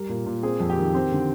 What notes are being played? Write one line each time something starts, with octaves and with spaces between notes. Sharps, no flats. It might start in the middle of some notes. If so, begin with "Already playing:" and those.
Already playing: G3 A#4
A#2
A#2
C4 G#4
F2
G4
D#3
C4
D3